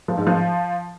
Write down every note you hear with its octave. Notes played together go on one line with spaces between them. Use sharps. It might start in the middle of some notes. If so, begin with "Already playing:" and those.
F3
G#2
F3